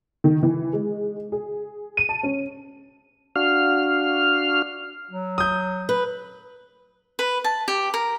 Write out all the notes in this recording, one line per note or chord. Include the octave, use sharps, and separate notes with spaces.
D#3
E3
G#3
G#4
D#7
A5
C#4
D4 F#4 F5 F6
F#3
D#6 G6
B4
B4
A5
G4
A#4